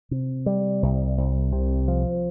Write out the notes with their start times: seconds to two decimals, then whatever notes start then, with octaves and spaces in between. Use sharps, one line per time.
0.11 C3
0.46 G3
0.83 C2
1.18 C2
1.53 C3
1.88 F3